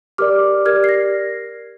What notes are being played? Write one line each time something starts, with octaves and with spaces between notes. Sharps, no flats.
G4 A#4 D5 D6 F6
G4 A#4 D5 F6 G#6
C7
A#6